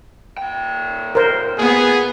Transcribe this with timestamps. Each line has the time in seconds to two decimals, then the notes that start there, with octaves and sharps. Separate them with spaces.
0.38 A#2 G5
1.15 A#4 C5
1.58 B3 G#4